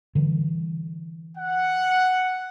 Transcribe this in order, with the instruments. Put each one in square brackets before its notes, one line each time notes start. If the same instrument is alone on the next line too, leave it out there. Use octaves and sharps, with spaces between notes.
[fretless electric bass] D3 E3 G3
[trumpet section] F#5